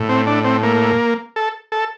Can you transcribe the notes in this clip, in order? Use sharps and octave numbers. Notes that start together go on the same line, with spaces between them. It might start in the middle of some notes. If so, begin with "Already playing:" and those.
Already playing: A2
C4
D4
C4
A#3
A4
A4